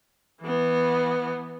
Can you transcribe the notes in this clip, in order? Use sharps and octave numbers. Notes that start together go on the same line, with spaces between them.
E3 B3